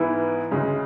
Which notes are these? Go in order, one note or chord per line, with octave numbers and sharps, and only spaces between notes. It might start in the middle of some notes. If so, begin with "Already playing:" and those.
Already playing: G#2 E3 B3 E4
D2 C#3 G#3